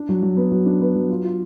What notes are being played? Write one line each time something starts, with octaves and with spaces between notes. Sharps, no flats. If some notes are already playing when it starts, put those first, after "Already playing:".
Already playing: D4
F#3
F#3
B3
F#3
D4
B3
F#3
F4
F4